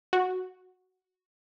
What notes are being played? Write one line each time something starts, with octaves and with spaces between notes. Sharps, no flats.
F#4